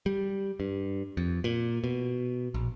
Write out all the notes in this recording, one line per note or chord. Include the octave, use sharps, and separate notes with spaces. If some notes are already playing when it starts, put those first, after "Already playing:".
G3
G2
F2
A#2
B2
A#1